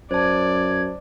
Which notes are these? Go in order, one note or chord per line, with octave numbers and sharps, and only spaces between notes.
F#2 C5 D5 A5 G#6